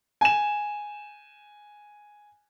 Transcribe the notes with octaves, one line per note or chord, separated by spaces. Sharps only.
G#5 E7